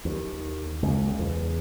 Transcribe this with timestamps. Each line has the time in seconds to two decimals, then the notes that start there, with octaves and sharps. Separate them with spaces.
0.05 D#2
0.83 C#2
1.19 E2